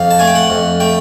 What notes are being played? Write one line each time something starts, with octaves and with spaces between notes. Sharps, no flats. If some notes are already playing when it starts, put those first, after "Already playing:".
Already playing: F2 F5
A5
A3 G#5
G5
F#5
F2
A3 G5